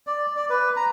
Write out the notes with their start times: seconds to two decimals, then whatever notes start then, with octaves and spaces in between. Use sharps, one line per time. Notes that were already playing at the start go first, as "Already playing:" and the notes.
0.07 D5
0.37 D5
0.50 B4
0.77 A#5